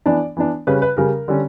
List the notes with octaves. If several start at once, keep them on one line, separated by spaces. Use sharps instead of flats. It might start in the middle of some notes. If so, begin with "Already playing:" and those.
E3 B3 D4 D5
E3 B3 D4
C#3 G3 C#4 B4
B4
C#3 G3 C#4 A#4
D3 G3 C#4